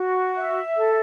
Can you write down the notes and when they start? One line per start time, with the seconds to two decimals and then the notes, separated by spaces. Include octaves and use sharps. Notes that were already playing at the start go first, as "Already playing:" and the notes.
Already playing: F#4
0.35 E5
0.77 A4